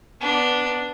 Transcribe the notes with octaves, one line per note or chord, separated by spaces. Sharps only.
B3 D4